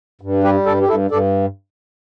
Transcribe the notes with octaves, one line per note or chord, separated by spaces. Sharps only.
G2
G3 G4 B4
G2 A4 D5
G4
G2 E4 A4
G2 A4 D5